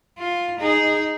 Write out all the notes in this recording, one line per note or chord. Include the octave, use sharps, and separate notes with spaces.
F4
D#4 G#4